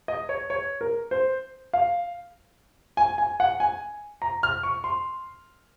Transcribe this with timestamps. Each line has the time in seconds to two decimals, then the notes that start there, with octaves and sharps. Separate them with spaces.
0.08 D#5
0.29 C#5
0.50 C#5
0.81 A#4
1.11 C5
1.73 F5
2.97 G#5
3.18 G#5
3.40 F#5
3.60 G#5
4.22 A#5
4.43 F6
4.63 C#6
4.84 C6